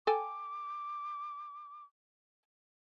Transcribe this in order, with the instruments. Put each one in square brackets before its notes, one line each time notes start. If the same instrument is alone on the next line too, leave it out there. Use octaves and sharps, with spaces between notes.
[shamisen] A4 G5 G#5 [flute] D6